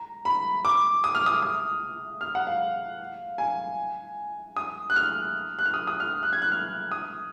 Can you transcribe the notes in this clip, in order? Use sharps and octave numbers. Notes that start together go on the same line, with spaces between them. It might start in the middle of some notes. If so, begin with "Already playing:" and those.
Already playing: A#5
B5
D6
D#6
F6
D#6
D#6
F6
F#5
F5
G#5
D#6
F#6
F6
F#6
F6
D#6
D#6
F6
F#6
G#6
F#6
F6
D#6